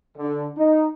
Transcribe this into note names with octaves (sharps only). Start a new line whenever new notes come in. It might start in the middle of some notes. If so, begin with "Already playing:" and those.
D3
D#4